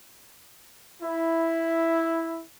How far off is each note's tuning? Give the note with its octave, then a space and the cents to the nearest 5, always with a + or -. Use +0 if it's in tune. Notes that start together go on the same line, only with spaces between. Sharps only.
E4 +0